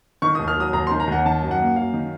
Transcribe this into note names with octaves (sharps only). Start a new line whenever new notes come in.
D#3 C#6
D#2 D#6
F6
F#3 D#6
D#2 A#5
D#3 C6
A#5
D#2 F#5
D#3 A5
F#2
F#5
A#3
F#2 F5
D#3